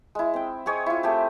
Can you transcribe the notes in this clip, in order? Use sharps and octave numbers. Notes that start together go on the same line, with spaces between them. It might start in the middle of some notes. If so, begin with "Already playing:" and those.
G#3 E4
C4 G5
C4 G#4 C#5 D#5
E4 F4
A3 C4 G4 G#4